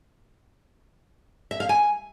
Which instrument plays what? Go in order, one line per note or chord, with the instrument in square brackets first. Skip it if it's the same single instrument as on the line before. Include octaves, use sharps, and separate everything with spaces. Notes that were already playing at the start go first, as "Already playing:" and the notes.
[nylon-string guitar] E5
F5
G#5